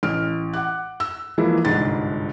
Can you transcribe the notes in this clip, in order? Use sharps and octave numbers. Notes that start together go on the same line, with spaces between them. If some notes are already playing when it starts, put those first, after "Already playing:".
A1 F6 D7
F#5 D6 F#6
E6
E3 F3 G#3 A#3 E4
G1 C2 G#2 A6